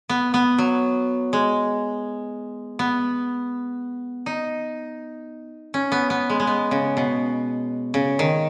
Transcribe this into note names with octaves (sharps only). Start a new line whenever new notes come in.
B3
B3
F#3
G#3
B3
D#4
C#4
B3
B3
G#3
G#3
B3
C#3
B2
C#3
D#3